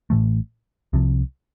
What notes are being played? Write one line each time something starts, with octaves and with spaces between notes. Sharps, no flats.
A1 A2 E3 A3
C2 C3 F3